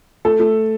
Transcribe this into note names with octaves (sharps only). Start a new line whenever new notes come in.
A3 A4
A3